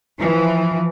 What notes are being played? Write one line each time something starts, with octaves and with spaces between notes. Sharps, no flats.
E3 F3